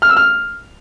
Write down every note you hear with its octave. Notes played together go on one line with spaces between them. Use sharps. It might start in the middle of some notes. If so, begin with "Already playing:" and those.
F6
E6
F6